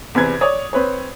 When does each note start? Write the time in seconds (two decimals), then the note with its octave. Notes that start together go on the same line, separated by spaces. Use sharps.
0.15 E2 C3 B4 G#6
0.41 C#5 D5 D#6
0.73 C4 B4 C#5